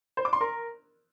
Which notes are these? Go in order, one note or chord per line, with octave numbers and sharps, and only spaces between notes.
C5
D6
C6
A#4